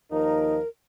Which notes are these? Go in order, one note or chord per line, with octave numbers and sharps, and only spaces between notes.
D#2 F3 D#4 A#4